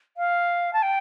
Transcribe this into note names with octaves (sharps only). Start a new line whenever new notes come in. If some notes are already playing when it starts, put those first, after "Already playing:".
F5
A5
G5